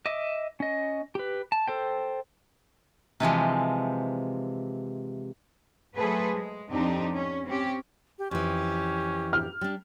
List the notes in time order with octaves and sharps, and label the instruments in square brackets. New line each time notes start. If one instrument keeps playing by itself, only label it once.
[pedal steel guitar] D#5 E5 D6
C#4 D#5
G4 B4
A5
A4 C5 G5
[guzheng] C3 E3 F3 G#3
[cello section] F#3 A3 G#4 A4 B4 C5
G#3
F2 C4 D4 D#4 G4
C#4
C4 C#4 G4
[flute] G4
[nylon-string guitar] F2 E3 [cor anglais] C#4 [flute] G4
[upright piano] F6
[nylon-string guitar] G3 D4